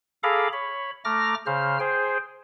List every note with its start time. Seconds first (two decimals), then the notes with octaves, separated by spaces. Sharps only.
0.23 G#4 A4 F5 A#5 B5 D6
0.53 C#5 B5
1.05 A3 A#5 D6 F6 A#6
1.46 C#3 C5 F6
1.80 G#4 C5 G5